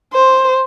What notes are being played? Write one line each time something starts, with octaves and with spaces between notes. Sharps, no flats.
C5